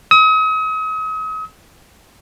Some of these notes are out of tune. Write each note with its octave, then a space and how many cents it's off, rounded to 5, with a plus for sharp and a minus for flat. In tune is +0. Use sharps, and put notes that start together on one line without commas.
D#6 +40